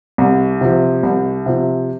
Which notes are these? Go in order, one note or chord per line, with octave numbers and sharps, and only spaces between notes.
C2
C3 F3
C2
C3 F3